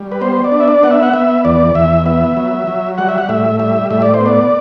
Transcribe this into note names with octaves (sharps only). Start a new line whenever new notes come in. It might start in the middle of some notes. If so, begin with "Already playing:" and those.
Already playing: G3
B4
B3 C5
D5
D4
E5
D5
B3 F#5
E5
F#5
B3 E5
E2 D5
E2 E5
B3 E5
F#3
F#3
G3 F#5
E5
F#5
A2 E5
G3 E5
A2 E5
D5
C5
B3
D5